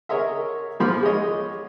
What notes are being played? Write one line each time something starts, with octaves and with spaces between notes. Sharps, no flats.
G#4 A#4 C#5 D#5 E5
G#2 F3 B5 C6 D6 F6
G#3 G#4 C#5 D#5